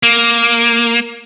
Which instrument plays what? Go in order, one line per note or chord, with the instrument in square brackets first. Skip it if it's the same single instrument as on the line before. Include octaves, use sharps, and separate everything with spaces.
[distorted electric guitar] A#3